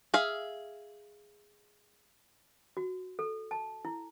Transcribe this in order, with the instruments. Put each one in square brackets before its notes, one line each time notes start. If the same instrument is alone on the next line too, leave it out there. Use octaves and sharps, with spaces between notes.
[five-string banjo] G#4 E5 F5
[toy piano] F#4
A4
A5
E4